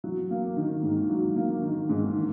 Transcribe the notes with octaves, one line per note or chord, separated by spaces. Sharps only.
F#3
A#3
D#3
G#2
F#3
A#3
D#3
G#2
D#3